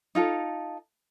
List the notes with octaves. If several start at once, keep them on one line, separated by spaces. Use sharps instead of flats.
D#4 F4 A4